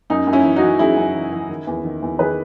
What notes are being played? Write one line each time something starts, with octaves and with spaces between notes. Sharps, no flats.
F#2 D#4
F#2
C#4 E4
E3
D#4 F#4
E3
F#2 E4 G#4
F#2
E3
E3
D#3
E2
D#3
E2
D#3 G#4 B4